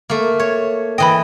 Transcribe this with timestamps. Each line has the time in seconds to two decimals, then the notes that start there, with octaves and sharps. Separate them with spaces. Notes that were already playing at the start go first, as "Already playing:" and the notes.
0.10 A3 A#3
0.40 C#5
0.98 E3 D#5 G5 B5